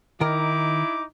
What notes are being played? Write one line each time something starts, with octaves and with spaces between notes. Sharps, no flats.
D#3 D#4 E4 A#4 D6